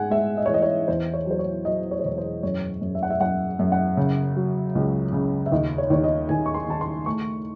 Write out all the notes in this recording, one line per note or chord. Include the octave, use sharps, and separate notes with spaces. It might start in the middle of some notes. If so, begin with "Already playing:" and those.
Already playing: G#2 G#3 F#5 G#5
G#3 E5
D#5
C#5
E3 D#5
C#5
E2 C5
C#5
F#3 C5
C#5
F#3 D#5
C#5
C5
E1 C#5
C5
F#2 C#5
F#2
E5
F#5
E5
F#2 F#5
F#2
F#5
C#3
F#3
C#2
C#3
E5
D#2 D#5
C#5
D#2 C#5
D#5
D#2 G#5
C#6
C6
D#3 A5
C6
A3 C#6